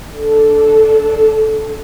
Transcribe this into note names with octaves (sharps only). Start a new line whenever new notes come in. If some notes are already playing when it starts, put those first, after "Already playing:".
D4 A4